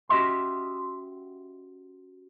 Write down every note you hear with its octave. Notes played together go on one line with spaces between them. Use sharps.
C#4 F#4 G4 D#5 E5 C6